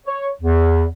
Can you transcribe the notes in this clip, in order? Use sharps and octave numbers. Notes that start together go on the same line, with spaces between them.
C#5
E2